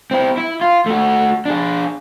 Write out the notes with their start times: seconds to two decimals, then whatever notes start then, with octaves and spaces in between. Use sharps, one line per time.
0.11 C4 E4
0.37 E4
0.61 F4
0.86 A3 F#4
1.46 D4 G#4